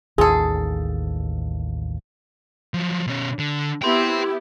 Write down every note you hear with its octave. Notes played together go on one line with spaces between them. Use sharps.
A1 D#2 F4 G#4 A4
F3 F#3
B2 C#4
D3
B3 E4 G4 G5 C6